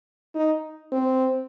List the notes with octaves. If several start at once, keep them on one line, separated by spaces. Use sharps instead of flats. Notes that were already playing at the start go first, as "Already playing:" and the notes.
D#4
C4